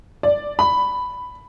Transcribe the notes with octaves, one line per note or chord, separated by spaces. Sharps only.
D5
B5